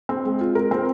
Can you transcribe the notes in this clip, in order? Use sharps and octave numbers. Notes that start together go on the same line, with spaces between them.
C4
G#3
F4
A#4
C4